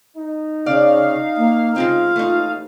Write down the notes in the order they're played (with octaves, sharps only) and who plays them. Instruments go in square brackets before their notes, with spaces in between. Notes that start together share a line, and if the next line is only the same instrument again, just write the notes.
[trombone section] D#4
[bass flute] C#3 [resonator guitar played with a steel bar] D5 [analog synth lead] F5
[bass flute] A#3
[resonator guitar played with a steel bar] C#3 G#3 C4 [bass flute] F4
[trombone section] A1 D#2 [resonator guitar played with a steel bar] A3 D#4